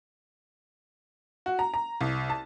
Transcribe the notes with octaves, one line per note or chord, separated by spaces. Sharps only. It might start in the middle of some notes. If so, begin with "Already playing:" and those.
F#4
A#5
A#5
C2
A5